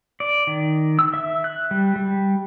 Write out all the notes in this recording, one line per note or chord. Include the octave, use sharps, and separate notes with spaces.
D5
D#3
E6
E5
F#6
G3
G3